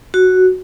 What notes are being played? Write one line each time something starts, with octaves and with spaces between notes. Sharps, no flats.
F#4